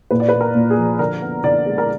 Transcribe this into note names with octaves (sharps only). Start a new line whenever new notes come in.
A#2 B4
D5
A#3 B4
A#4
A#2
G#4
F3
D3 A#4
B3
D3 D5
G#3
A#4